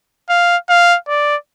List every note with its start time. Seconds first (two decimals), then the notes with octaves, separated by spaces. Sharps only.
0.29 F5
0.69 F5
1.08 D5